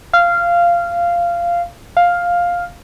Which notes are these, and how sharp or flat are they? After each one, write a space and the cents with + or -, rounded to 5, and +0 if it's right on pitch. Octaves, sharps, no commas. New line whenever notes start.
F5 -15
F5 +5